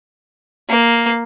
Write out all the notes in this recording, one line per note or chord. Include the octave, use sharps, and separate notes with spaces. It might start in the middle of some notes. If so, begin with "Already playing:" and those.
A#3